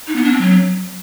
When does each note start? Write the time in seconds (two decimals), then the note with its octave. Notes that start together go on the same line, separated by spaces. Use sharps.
0.07 D#4
0.16 B3
0.24 D4
0.33 C4
0.41 F#3